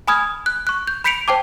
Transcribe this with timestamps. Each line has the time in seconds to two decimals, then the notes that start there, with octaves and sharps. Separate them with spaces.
0.08 G#5 B5 D#6 F6 G#6
0.46 F#6
0.67 C#6 F#6
0.87 G6
1.04 B5 G6 B6 C#7 D7 F7
1.28 C5 G5 A5 D6